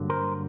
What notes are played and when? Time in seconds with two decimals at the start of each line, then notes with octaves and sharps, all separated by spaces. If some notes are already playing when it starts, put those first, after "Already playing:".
Already playing: G2 D3 F#3 A#3
0.10 A#4 C5